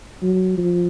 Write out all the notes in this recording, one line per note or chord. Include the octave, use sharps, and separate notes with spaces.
F#3
F3